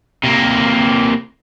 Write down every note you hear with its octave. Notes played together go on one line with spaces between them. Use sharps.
C3 A#3